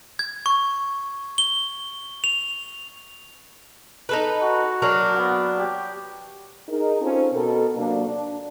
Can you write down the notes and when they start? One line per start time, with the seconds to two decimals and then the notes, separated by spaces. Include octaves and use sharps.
0.19 G#6
0.46 C#6
1.38 G7
2.24 F7
4.09 D#4 A4 B4
4.42 F#4
4.82 F#3 A#3 D4
5.17 B3
5.58 G4
6.69 D#4 G#4 A#4
7.02 C4 C#4 D#4 F4 A4 C5
7.33 B2 A4 A#4
7.75 C3 F#3 A#3 D4
8.08 D4